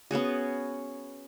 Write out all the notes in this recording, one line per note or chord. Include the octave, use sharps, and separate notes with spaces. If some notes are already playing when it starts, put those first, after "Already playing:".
B3 C#4 F#4 G#4